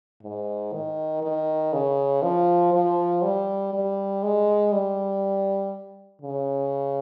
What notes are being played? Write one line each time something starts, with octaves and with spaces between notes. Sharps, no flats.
G#2
D#3
D#3
C#3
F3
F3
G3
G3
G#3
G3
C#3